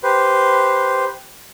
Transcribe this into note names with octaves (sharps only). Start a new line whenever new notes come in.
G4 B4 C5